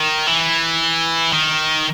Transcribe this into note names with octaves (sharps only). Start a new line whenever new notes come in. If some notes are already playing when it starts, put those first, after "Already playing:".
Already playing: D#3
E3
D#3